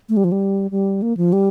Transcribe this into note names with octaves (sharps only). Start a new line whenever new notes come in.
A3
G3
F3
G3
G3
A#3
F3
G3